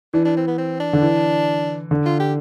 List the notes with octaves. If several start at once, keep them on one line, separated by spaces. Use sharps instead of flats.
E3 D4
D4
C4
B3
C4
D4
D3
E3
D3
F4
G4